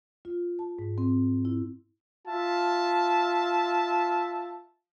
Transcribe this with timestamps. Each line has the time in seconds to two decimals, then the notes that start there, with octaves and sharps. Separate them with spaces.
0.25 F4
0.59 A5
0.79 G#2
0.98 C4
1.45 E4
2.27 F4 E5 A5